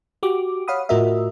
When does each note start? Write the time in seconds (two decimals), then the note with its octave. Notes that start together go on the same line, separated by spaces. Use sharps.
0.23 F#4 G4 D6
0.68 C#5 F5 F#5 B5 D#6
0.89 A2 F4 F#4 A#4 D#5 E5